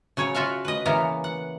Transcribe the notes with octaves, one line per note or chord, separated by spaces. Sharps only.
C#3 F#3 C#5
F4 F#4 E5 F5
B4 D#5
C#3 E3 A#3 B3 F5 A#5
F#5